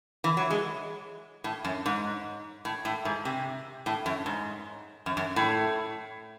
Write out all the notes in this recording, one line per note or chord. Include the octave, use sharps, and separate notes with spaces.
E3
F#3
G#3
A2
F#2
G#2
A2
A2
G#2
C3
A2
F#2
G#2
F#2
F#2
A2